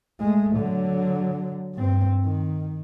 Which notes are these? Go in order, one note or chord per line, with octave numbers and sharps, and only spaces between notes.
G#3 A3
D3 F#3
G2 C4
D#3